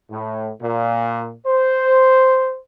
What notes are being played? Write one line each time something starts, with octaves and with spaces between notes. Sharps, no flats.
A2
A#2
C5